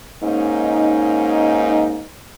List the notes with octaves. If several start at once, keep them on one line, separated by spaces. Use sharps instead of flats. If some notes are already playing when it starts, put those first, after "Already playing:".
G#2 A#3 C#4 D#4